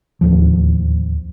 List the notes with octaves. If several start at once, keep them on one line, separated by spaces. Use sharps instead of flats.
D1 G1 D#2 F3